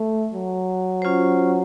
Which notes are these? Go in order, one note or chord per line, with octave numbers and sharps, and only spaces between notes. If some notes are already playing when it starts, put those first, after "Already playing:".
Already playing: A3
F#3
C#4 F4 C5